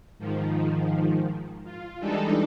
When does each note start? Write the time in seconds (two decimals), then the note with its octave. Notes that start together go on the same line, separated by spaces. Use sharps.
0.19 G#2 D#3 F3
1.64 F4
2.00 E3 G3 G#3 D4 D#4 A4